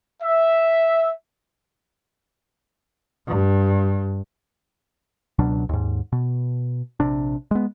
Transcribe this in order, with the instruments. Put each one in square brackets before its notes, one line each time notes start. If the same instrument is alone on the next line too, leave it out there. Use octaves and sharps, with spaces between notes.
[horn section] E5
[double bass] G2
[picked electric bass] C#2 B2 F#3 D4
D#2 G#2
B2
A#1 C3 D4
G#3 B3